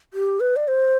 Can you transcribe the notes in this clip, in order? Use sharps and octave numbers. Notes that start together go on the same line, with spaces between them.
G4
B4
D5
C5